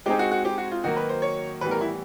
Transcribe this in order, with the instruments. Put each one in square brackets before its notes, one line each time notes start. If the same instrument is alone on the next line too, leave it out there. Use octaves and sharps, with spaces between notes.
[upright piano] G#3 C4 D#4 G#4 [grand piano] G4
[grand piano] F#4
F#4
G4
F#4
F4
[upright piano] D#3 F#3 A#3 [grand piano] F#4
[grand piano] B4
C5
C#5
[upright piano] A2 E3 G3 B3 [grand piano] B4
[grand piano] A#4
E4